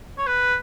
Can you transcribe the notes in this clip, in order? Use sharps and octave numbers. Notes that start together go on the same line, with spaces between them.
C#5
B4